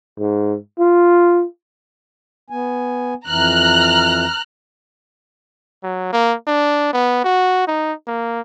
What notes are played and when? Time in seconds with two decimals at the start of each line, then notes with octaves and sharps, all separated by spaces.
0.19 G#2
0.79 F4
2.50 B3 G#5
3.27 F2 E3 A#5 F6 F#6
5.83 F#3
6.13 A#3
6.47 D4
6.93 B3
7.24 F#4
7.67 D#4
8.07 A#3